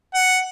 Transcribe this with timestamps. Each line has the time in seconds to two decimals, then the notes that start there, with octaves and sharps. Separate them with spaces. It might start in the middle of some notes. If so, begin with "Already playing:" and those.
0.15 F#5